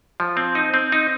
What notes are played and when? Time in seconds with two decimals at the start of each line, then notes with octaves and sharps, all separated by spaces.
0.20 F3
0.37 C4
0.55 D#4
0.74 C4
0.92 D#4